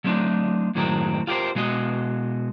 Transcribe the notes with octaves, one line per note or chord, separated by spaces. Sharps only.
F#3 G3 A3 C4 D4 D#4
F#2 A2 D#3 F#3 G#3 C4
F4 G4 G#4 A#4 C5
B2 G#3 F#4 D#5